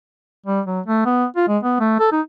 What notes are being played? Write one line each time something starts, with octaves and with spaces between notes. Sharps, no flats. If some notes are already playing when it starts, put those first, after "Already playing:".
G3
F#3
A3
B3
F4
G#3
B3
A3
A4
D#4